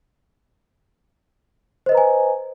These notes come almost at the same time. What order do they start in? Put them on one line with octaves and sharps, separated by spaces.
C5 D#5 B4 A#5 G#5